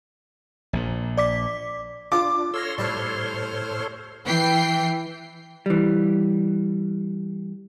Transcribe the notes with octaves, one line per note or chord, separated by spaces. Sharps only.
A#1 A#2
D5 D6 B6
D4 F4 D6
A4 C#5 C6 E6 F6 A#6
A2 G3 B4 C5 F6
E3 G5 C7
E3 G3